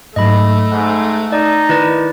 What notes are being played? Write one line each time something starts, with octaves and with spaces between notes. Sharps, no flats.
G#2 F#3 A3 D#5 B5
G#2 F#6
D#4 D5
D#3 E4 B4 D5